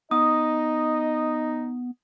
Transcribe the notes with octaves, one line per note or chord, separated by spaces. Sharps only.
B3 D#4 D#5 D#6